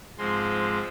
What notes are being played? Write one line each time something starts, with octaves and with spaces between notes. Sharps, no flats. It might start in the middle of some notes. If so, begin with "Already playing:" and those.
G#2 F3 G#3 C4 C6